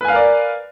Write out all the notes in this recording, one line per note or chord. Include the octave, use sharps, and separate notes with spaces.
A#4 B4 D5 F5 G#5